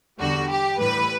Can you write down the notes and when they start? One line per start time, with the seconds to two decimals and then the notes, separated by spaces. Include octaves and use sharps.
0.19 E2 D3 G3 F#4
0.49 G4
0.79 A2 E3 G3 B4